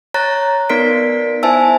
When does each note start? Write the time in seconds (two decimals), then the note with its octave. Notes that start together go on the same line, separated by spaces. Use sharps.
0.14 C#5 A#5 F#6 A6 A#6
0.69 B3 D#4 A#4 D5 B6 D7
1.43 E4 C5 E5 G#5 A5 E6